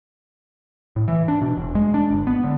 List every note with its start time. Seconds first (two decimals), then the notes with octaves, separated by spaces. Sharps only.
0.96 A2
1.08 E3
1.28 D4
1.41 B2
1.58 E1
1.75 G#3
1.94 D4
2.11 G1
2.27 B3
2.44 D3